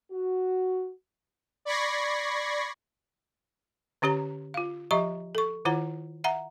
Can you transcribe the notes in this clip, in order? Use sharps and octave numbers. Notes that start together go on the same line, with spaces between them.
F#4
D5 B5 C#6 G#6 A#6 C7
D3 C#4 G4 C#5 A#5
F4 F5
F3 G4 D#5 E5 A#5 C#6
A4 C#6
D#3 E4 F4 C#5 F#5 A#5
E5 F#5 A#5